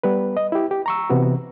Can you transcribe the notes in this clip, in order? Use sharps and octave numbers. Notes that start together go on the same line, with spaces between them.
G3 B3 B4
D#5
E4 G4
G4
A#5 C#6 E6
C3 E3 B3 F#4